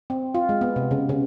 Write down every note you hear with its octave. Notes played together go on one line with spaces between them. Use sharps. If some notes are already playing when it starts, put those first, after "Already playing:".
C4
F4
G#3
B3
C3
C#3
C#3